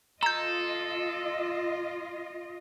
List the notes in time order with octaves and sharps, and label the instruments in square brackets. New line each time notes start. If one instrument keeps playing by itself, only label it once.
[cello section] F4 D#5 [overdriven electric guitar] A4 [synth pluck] A#5 G6